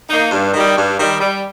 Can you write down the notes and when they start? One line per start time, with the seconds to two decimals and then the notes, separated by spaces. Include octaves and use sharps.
0.09 A#3 D#4
0.31 G2
0.54 D#3 G3
0.76 G2
0.99 D#3 G3
1.20 G3